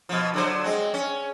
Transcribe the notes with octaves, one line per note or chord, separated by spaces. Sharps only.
B2 F3
D3 F#3 C5
G#3 C4
C#4